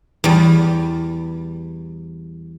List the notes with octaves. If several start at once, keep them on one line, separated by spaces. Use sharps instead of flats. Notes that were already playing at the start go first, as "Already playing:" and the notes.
E2 G3